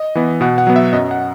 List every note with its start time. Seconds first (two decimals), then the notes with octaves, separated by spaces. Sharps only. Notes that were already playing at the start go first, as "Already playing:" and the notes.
Already playing: D#5
0.15 E3 B3
0.41 B2 F#5
0.58 F#5
0.67 F#3 B3
0.76 E5
0.93 F#2 D#5
1.11 F#5